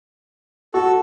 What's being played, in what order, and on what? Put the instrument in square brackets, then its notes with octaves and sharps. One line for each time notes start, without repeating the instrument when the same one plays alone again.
[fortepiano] F#4 [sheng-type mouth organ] A4